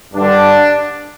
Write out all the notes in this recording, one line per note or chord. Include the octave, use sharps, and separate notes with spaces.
G2 D3 D4